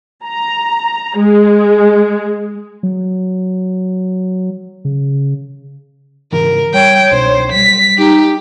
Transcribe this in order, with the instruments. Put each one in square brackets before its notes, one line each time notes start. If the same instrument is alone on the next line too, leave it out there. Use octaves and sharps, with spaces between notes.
[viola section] A#5
G#3
[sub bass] F#3
C#3
[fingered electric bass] G#2 C#3 E3 [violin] A#4
[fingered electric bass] G3 [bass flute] C#5 [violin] G5
[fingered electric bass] C2 B2 D4 [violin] C5
[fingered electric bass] F#3 G3 [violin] B6
[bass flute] D#4 [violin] G4